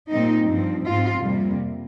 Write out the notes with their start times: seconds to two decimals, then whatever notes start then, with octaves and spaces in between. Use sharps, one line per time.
0.11 A#2 G3 C4 D#4
0.48 G2 F3 C4
0.86 G#2 F3 C4 F4
1.22 F2 C3 G3 A#3